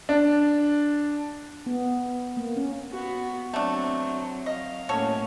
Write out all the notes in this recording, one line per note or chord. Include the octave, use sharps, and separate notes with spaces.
D4
B3
A#3
C#4
B3 F#4
F#3 A3 C4 D4
D#5 F5
A2 A#3 C#4 F#4 A4 C#5